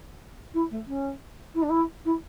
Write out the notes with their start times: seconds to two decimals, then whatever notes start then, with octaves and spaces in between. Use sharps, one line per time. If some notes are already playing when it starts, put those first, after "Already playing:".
0.54 E4
0.71 A3
0.87 C#4
1.55 E4
1.63 D4
1.70 E4
2.05 E4